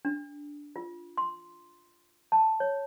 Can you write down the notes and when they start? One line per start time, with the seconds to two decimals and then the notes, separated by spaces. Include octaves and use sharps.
0.05 D4
0.76 F4
1.18 C6
2.32 A5
2.60 C#5